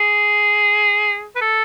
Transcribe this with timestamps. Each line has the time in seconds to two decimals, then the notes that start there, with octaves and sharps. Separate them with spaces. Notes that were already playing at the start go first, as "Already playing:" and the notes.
Already playing: G#4
1.36 B4
1.41 A4